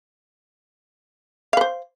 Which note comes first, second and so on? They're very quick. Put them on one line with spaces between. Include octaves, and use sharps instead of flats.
F5 B4 C5